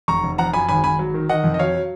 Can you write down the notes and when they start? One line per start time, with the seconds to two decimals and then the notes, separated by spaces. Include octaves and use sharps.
0.08 F1 A#5 C#6
0.24 F1
0.38 F3 F#5 A#5
0.53 F#2 G#5 B5
0.69 G#1 G#5 B5
0.84 G#1 G#5 B5
0.99 F#3
1.14 D#3
1.29 D#3 D#5 F#5
1.44 F2
1.54 D#5
1.59 F#3 C#5 F5
1.75 F#3